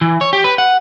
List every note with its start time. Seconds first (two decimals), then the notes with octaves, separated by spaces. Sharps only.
0.01 E3
0.21 C#5
0.33 G4
0.44 B4
0.58 F#5